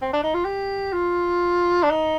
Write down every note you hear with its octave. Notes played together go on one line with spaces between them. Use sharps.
C4
D4
D#4
F4
G4
F4
D4
D#4